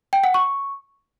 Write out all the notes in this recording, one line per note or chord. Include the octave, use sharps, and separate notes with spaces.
G5
F#5
C#6